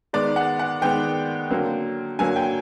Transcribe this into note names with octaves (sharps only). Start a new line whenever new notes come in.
D#3 G#3 B3 D5
F#5
F#5
D#3 G#3 B3 G5
D3 F#3 A#3
D3 F#3 A#3 G#5
G5